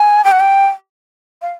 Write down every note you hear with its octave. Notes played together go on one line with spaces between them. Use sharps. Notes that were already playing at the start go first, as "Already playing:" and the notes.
Already playing: G#5
G5
F#5
G5
F5